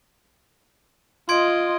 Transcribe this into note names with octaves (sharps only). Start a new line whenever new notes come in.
F4 D#5 C6 G#6 D7